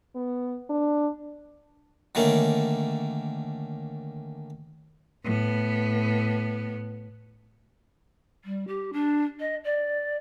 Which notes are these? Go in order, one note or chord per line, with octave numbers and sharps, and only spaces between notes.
B3
D4
D3 D#3 A3 A#3 C#4
A2 B3
G3
G4
D4
D#5
D5